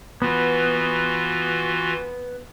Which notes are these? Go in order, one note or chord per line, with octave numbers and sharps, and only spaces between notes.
E3 B3 F4 F#4